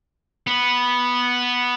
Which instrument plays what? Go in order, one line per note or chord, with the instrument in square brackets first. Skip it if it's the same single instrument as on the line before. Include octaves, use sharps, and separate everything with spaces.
[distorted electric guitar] B3